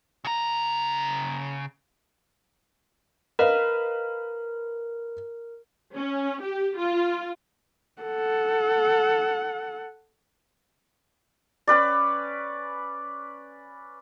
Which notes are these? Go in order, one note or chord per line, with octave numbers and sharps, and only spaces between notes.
C#3 A#5
A#4 B4 D#5 F5
C#4
G4
F4
A4 F#5
C#4 B4 D5